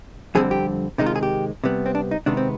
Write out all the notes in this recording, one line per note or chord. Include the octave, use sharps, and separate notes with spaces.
F2 D3 G3 C4 G#4
G4
C3 D#3 G#3 D#4
F4
G#4
G4
C3 G3 B3
C4
D4
D#4
C3 D#3 G#3 B3 D4
C4